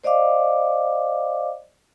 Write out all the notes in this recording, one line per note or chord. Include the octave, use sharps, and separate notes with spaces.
C5 D5 D#5 F5 D6